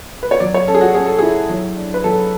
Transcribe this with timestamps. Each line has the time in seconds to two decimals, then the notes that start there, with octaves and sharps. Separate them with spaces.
0.23 B4
0.31 C#5
0.40 F#3 D5
0.54 C#5
0.67 C#4 A4
0.75 G#4
0.81 F#4
0.95 C#4 G#4
1.07 A4
1.18 E4 G#4
1.49 F#3
1.77 D4
1.94 B4
2.04 F#3 A4